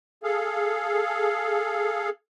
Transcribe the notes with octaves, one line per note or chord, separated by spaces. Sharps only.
G#4 A4 F5